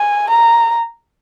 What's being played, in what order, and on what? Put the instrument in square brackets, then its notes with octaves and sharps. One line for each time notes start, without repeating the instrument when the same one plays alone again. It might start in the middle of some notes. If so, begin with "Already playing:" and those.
Already playing: [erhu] G#5
A#5